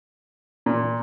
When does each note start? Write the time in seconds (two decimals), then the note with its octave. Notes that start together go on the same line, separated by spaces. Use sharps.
0.66 A#2